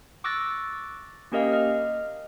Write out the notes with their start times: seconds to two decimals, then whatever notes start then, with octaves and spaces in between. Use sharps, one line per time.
0.24 C#6 D6 E6 F#6 A6 A#6
1.32 A#3 C#4 G4 A#4 D#5 F5
1.52 D#5 F6